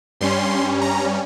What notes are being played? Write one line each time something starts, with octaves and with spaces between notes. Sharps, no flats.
G2 G3 C#4 C6
A#5